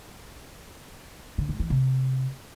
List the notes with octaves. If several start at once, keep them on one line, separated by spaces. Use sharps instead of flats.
D3
G#2
E3
C3